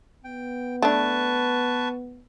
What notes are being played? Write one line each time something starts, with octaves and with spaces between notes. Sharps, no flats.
B3 G5
A3 D4 B4 A5 C#6